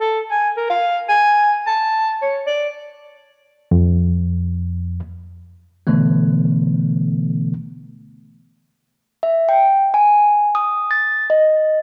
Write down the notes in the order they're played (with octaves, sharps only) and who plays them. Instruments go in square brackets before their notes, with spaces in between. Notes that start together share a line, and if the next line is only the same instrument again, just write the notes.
[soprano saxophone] A4
G#5
A#4
F5
G#5
A5
C#5
D5
[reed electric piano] F2
[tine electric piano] B2 D3 E3 A3 B3
[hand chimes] E5
G5
G#5
D#6
A6
D#5